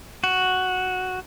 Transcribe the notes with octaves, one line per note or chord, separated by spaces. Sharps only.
F#4